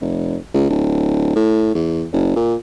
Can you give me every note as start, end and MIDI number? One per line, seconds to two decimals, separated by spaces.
0.01 0.37 29
0.54 0.68 37
0.70 1.31 26
1.36 1.71 45
1.75 2.05 40
2.13 2.31 30
2.36 2.55 46